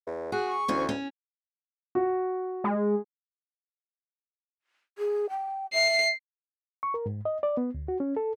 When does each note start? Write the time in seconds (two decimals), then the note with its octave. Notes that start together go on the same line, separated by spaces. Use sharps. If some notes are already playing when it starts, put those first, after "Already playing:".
0.06 E2
0.32 F#4 G#4 F#6
0.49 C#6
0.68 D2 E3 C#4 C5
0.89 C#4
1.95 F#4
2.64 G#3
4.98 G#4
5.30 G5
5.73 E5 C7
6.83 C#6
6.94 A#4
7.06 G#2
7.25 D#5
7.43 D5
7.57 B3
7.74 D2
7.88 F#4
8.00 C#4
8.17 A4